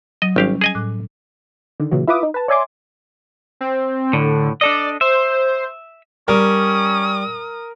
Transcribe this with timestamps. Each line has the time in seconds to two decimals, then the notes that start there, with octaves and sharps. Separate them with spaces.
0.22 F#3 D#5 D#6
0.36 G#1 G3 C#4 G4 F5
0.61 G#4 D#5 G#5
0.75 A2 D6 F#6
1.80 D3 D#3
1.91 A#2 C#3 E3 F#3
2.07 E4 F4 B4 E5 D6 D#6
2.23 D#4
2.34 B4 A5
2.48 C#5 D5 E5 G#5 C6 D6
3.61 C4
4.13 A2 D3
4.61 D4 A4 D5 D#5
5.01 C5 E5
6.28 G3 C#4 A#4 D#6